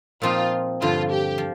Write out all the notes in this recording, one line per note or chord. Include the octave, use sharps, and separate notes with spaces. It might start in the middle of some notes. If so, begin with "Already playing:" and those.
A#2 F3 C4 D#4 F4
G2 D3 F3 F4
G4
F3